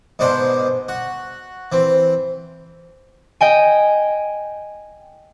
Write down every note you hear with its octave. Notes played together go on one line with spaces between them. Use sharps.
G#2 B2 D4 C5
F#4
E3 C4
D#5 G5 G#5